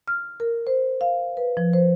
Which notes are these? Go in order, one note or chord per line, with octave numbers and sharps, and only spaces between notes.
F6
A#4
C5
F5
B4
F3
C5